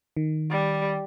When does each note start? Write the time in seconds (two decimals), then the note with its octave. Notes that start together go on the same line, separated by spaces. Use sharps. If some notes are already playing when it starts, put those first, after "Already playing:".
0.17 D#3
0.51 G3